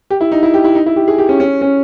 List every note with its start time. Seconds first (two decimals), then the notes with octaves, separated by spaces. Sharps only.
0.10 G4
0.21 E4
0.32 D#4
0.43 E4
0.54 G4
0.64 E4
0.75 D#4
0.86 E4
0.96 G4
1.08 G#4
1.18 G4
1.29 C#4
1.40 C#4
1.62 C#4